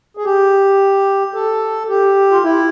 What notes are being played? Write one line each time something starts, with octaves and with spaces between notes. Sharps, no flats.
G#4
G4
A4
G4
F4
E4